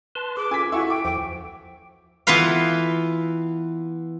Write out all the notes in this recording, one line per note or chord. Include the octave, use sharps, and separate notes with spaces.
B4 A5 C6
G#4 B4 D6
C#4 F4 A4 G#5 B6
E4 F#4 A4 C#6
G5 D6
E2 F3 G5
E3 B3 F4 B4 F5